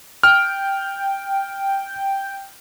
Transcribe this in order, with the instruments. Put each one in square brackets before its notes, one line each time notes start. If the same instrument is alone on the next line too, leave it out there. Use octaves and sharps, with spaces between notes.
[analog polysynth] G5 [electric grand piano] F6